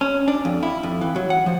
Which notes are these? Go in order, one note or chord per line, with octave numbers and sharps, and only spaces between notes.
C#4
D4
F2
E4
F2
E3
F#3
F#5
F3